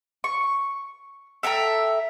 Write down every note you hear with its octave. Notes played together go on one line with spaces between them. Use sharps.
C#6
A4 E5 G5 A#5